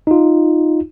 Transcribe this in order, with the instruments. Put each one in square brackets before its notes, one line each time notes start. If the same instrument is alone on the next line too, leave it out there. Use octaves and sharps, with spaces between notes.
[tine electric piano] D#4 F4